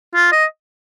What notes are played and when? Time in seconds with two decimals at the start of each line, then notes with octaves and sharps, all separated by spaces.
0.15 F4
0.32 D#5